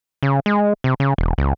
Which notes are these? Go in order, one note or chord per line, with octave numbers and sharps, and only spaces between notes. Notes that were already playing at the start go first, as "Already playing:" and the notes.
C#3
G#3
C3
C#3
E1
C#2